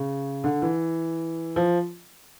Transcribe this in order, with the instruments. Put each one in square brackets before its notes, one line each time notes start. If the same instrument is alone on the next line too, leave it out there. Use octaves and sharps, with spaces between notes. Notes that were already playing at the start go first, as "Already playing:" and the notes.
Already playing: [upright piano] C#3
D3
E3
F3